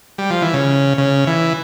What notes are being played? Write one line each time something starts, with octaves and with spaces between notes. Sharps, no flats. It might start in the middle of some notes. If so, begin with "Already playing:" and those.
G3
F3
E3
C#3
C#3
E3